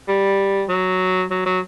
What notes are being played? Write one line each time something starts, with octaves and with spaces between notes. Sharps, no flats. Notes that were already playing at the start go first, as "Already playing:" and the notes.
G3
F#3
F#3
F#3